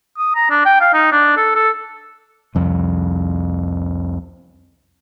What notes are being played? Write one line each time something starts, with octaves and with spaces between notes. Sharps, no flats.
D#6
A#5
D4
G5
F5
D#4
D4
A4
A4
C2 F2